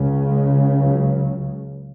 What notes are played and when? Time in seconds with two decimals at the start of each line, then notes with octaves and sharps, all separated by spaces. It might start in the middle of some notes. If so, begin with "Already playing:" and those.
Already playing: C#2 C#3
0.29 G#3
0.82 F#3